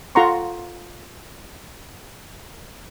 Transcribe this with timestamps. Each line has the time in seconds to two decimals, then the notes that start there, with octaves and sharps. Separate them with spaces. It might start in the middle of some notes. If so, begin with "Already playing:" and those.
0.15 F4 A4 F#5 A#5 C6 C#6